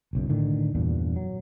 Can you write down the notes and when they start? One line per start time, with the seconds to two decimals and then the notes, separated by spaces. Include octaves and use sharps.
0.13 F#1 B1 F#2
0.29 A2 D3 D#3
0.75 E2 G2 A#2
1.16 F#3